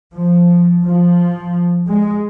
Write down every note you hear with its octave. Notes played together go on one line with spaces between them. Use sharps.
F3
F3
G#3